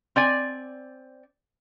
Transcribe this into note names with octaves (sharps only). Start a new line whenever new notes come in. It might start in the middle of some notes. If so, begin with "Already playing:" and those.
C4 D5 G#5